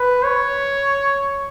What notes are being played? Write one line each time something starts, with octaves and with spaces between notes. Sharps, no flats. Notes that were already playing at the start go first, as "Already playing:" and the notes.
Already playing: B4
C#5